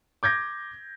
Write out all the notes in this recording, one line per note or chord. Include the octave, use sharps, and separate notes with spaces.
D6 G6 G#6 A#6